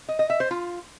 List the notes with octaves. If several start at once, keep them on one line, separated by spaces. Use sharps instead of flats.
D#5
D#5
E5
C5
F4